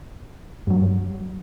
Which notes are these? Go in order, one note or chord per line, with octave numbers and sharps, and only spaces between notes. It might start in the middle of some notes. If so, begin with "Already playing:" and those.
G2 F#3